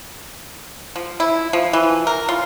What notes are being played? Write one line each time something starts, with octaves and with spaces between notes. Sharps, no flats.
F3
E4
F3
E3
A#4
F4